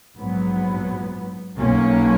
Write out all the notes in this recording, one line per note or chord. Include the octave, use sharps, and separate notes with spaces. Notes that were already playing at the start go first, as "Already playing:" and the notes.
A#1 G#2 F#3 B3
B1 B2 F#3 A#3 C#4